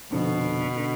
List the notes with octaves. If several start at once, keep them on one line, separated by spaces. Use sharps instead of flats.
F1 F2 B2 D3
D3